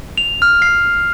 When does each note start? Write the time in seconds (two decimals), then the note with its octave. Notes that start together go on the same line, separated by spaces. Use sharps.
0.18 F7
0.42 F6
0.62 C7